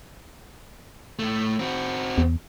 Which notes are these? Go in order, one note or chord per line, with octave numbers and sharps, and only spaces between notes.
A2 A3
C4 F#4
E2